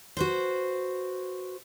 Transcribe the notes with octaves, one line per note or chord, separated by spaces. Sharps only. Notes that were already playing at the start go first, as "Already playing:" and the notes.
F#4 B4 C5